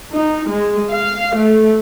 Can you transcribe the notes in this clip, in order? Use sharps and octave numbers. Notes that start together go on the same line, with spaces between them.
D#4
G#3
F5
A3